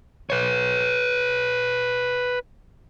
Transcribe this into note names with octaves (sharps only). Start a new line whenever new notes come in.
B4 C#5